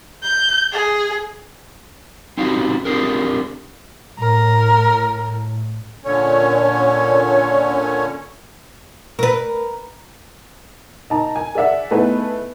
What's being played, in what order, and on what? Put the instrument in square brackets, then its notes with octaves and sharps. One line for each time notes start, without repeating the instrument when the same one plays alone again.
[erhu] G6
G#4
[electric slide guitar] C4 C#4 D#4 F#4 G4 B4
C4 D4 G4 G#4 A#4
[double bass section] A2 [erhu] A#4
[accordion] A#2 D3 C#4 C#5
[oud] A#4 B4
[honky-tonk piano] D#4 A5 A#5
G#5
G#4 D5 E5 F#5
A3 B3 D#4 E4 G#4 B4